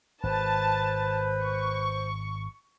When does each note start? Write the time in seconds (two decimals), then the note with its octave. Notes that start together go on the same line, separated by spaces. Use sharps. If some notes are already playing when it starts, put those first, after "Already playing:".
0.23 G#1 B4 C5 A5
1.43 C#6